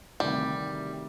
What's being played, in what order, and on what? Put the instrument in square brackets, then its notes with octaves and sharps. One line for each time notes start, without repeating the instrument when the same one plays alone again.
[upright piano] D2 C3 D#3 [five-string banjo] G3